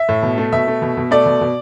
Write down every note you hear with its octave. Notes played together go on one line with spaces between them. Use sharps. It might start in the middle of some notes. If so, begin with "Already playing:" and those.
Already playing: E5
A2
B2
A3
B2 E5
A3
B2
B2
A3 D5
B2
B2